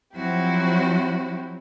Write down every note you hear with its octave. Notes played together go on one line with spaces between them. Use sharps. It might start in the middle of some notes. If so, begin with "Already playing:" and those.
F3 F#3 C4 E4 F#4 G4